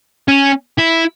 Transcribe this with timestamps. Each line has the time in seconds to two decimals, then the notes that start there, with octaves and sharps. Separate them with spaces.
0.28 C#4
0.78 E4